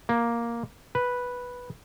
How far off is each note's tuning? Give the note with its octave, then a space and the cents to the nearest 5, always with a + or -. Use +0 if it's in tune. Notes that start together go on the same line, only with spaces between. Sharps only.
A#3 +5
B4 -5